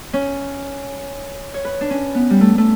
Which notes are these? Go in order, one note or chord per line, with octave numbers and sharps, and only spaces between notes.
C#4
C#5
B4
D4
C#4
B3
G3
A3
A3